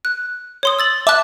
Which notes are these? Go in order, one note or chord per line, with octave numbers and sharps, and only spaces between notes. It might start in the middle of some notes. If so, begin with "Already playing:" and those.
F#6
C#5 C6 D#6
E6 A6 F#7
E5 A5 D6 F#6